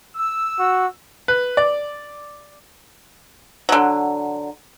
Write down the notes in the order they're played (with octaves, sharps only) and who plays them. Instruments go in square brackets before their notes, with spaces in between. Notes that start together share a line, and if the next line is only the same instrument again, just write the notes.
[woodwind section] E6
[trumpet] F#4
[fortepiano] B4
D5
[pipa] D3 F#3